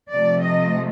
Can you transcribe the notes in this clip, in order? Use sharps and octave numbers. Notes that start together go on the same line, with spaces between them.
C3 F3 A3 D5
D#5